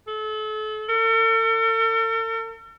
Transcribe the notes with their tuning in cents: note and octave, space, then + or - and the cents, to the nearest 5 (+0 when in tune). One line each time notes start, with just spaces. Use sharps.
A4 -35
A4 +45